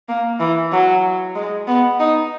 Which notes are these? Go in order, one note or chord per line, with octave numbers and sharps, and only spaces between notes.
A#3
E3
F#3
G#3
B3
D#4